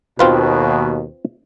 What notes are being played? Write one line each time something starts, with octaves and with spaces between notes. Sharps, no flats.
D#2 B2 C4 F4 B4